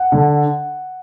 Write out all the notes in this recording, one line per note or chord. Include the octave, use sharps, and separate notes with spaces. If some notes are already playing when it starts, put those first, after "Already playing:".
Already playing: F#5
D3